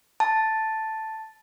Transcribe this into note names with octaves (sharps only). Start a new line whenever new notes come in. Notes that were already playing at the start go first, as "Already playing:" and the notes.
A5